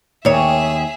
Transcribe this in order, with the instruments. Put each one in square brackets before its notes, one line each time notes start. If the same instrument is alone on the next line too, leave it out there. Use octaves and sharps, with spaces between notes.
[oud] D#2 C#5 [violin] G#4 E5